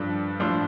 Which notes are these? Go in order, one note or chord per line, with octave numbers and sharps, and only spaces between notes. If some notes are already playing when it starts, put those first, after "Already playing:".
Already playing: G2 F3 D4 A4
A2 F3 D4 F4 C5